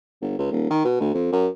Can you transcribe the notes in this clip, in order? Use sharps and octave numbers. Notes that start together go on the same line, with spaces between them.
G1
C#2
D#1
D#3
B2
D2
F2
F#2